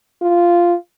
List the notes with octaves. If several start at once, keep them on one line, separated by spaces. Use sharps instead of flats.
F4